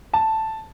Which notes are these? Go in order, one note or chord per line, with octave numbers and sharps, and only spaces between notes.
A5